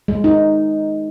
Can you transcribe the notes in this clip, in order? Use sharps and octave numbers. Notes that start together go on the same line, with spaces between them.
G#3
D#4